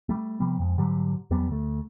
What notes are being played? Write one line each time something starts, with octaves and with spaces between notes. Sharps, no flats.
G3 A3
C3 F3 G3 B3
F2 G#3
G#2 D3 F#3 G3
E2 F#3 G3 B3
D2 A3